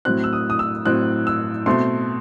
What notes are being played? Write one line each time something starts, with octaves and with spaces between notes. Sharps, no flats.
A2 F#3 C4 F#6
E6
D#6
D#6
E6
A2 F#3 C4 F#6
E6
B2 A3 C4 C6